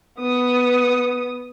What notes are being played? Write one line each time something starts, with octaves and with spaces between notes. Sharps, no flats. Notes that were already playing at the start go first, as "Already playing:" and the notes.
B3 D#6